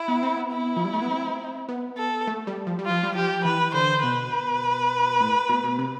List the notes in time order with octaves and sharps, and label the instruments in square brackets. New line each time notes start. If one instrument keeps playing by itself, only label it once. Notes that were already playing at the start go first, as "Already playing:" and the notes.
Already playing: [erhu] E4
[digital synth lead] B3
C4
B3
[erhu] E4
[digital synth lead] F3
G3
A3
B3
C4
B3
[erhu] A4
[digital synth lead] A3
G3
F3
G3
[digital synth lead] F3 [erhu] F4
[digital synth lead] G3
[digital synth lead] F3 [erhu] G4
[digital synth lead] E3 [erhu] B4
[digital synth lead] D3 [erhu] C5
[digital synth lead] B2 [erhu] B4
[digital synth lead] A2
B2
B2
C3